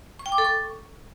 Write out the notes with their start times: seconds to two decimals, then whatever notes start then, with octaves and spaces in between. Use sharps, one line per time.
0.19 C#6
0.26 G5
0.32 D6
0.38 A4
0.45 C#6